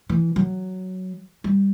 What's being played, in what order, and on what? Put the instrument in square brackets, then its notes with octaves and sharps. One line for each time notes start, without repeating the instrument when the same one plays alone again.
[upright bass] E3
F#3
G3